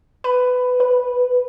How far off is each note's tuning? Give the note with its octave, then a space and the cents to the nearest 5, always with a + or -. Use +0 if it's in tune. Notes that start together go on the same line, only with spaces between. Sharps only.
B4 +15
B4 -10